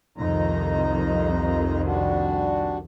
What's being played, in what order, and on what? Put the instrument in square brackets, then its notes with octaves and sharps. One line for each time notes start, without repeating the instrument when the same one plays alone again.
[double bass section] C2 F2 D#3 [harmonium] D#4 A#5
[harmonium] G3 D4 F#4